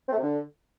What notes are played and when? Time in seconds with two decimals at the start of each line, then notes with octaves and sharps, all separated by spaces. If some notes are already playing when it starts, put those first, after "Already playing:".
0.07 C4
0.13 A3
0.18 C3
0.23 D3